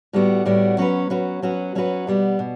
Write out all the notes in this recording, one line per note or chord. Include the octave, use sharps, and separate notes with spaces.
A2 G3 B3 F#4
A2 G3 B3 F#4
F#3 C#4 F#4 B4
F#3 C#4 F#4 B4
F#3 C#4 F#4 B4
F#3 C#4 F#4 B4
B2 G3 B3
B2